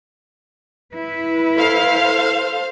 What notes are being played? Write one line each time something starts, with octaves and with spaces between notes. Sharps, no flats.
E4 B4
A4 C5 F5